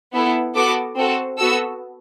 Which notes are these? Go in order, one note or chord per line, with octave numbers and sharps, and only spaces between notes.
B3 E4 A4
B3 F#4 A4 D6
C4 F#4 A4
B3 F#4 A4 E6